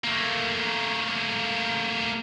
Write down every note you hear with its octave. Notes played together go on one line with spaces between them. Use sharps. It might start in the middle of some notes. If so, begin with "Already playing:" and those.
A3 A#3